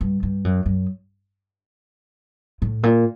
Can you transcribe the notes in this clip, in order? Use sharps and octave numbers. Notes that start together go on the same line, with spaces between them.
G2
G2
F#2
F#2
A2
A#2